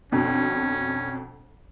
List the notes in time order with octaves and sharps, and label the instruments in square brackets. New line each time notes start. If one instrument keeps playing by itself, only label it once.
[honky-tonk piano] F2 B2 D3 [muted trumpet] C#4